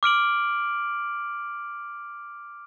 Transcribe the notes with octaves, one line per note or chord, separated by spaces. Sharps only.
D6 F6 D7 F#7